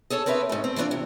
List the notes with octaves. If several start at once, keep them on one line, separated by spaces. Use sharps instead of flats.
G#4 A4 C#5 A5
C4 A#4 B4 C#5 E5
G#2 A3
C4
E3 A3 B3 D4 F4
C3